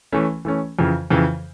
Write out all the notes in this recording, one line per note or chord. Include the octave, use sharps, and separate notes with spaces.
E3 A3 C#4
E3 A3 C#4
F2 C#3 E3
F2 C#3 E3